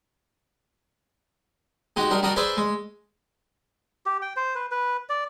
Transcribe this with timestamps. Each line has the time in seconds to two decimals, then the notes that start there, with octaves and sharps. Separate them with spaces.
1.96 G#3 D#4 F#4 G4
2.10 G3 D4 A#4 D#5
2.23 G3 D4 F#4 A#4 F#5 D#6
2.36 G#4 B4 C5 D5 E5
2.57 G#3
4.06 G4
4.22 G5
4.36 C5
4.55 B4
4.71 B4
5.09 D5